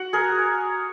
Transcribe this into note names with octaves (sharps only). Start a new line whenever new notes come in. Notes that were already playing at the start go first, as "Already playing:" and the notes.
Already playing: F#4
G#4 A#4